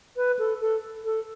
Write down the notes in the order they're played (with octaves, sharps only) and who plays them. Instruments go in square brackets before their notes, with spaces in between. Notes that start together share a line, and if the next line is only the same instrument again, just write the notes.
[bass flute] B4
A4
A4
A4